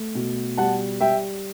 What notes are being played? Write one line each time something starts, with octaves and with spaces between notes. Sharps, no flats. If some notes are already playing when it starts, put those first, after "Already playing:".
Already playing: A3
B2
G3 F#5 A5
G3 E5 G5